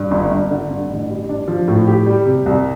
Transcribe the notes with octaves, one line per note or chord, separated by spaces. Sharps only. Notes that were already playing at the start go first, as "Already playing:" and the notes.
Already playing: G2
G1
G1
D3
G2
A1
G3
D4
F3
A2
G4
G3
C3
C2